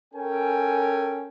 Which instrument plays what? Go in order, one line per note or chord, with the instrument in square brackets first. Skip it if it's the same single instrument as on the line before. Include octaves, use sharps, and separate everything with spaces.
[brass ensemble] C#4 A4 A#4 G5 G#5